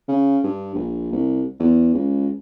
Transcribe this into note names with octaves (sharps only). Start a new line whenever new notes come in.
C#3
G2
A#1
C2
E2
C#2